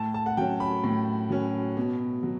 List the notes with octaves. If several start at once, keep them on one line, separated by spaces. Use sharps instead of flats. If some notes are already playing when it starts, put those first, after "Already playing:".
Already playing: A2 A5
A5
F#5
F#3 C#4 G5
B5
A2
F#3 C#4
B2
F#3